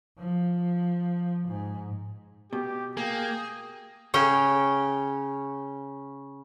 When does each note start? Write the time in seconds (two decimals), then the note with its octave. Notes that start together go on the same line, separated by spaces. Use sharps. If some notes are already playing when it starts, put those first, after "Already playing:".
0.19 F3
1.48 G#2
2.53 B2 G4
2.97 A#3 G#4 G5
4.14 C#3 C#4 G5